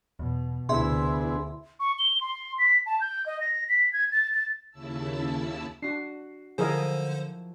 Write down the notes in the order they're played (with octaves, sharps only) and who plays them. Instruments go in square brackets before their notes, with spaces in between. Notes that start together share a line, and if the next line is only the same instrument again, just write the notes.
[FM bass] E2 [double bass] B2
[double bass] D2 E4 [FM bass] C3 [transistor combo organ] B3 D4 G#4 [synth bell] E5 C6
[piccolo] C#6
G7
C6
B6
A5
G6
D#5
A#6
B6
G#6
A6
A6
[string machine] D#2 C#3 E4 A5 E6
[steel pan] D4 [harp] F#4 C7
[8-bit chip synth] D3 C5 [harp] F3 E4 [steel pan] G#4 A#4 D#5